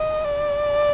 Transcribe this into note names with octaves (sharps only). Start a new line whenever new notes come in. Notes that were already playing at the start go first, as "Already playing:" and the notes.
Already playing: D#5
D5